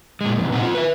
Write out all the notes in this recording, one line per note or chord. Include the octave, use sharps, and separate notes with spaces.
A#2 G#3
F2 C3 E3
A#2 C4 D#4 F#5
C4 F4
B4 E5